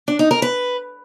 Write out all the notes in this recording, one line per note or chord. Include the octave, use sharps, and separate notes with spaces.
D4
D#4
A#4
B4